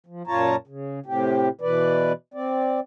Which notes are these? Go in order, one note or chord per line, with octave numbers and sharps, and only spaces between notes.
F3
F#2 A#2 F4 C#5 A5 A#5
C#3
A2 C3 G4
B2 E3 B4 D5
C4 D5